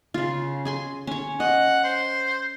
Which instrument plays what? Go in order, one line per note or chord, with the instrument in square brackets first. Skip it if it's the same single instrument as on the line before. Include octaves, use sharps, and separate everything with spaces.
[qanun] C#3 F4
G#4 G#5 C6
C#4 C#5
[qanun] D#5 [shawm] F#5
[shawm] C5